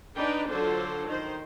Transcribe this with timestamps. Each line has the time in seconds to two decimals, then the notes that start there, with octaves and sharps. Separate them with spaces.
0.17 D4 D#4 B4 D5 G5
0.49 D3 F#3 D4 F4 A4 C5
1.06 D#3 C5